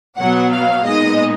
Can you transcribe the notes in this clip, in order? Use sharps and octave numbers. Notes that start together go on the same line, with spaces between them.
B2 F#3 B3 F#5
F5
A#2 G#3 B3 D#4 D#5